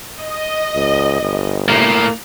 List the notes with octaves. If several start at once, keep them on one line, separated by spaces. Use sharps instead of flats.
D#5
C#2
G1
A2 A#3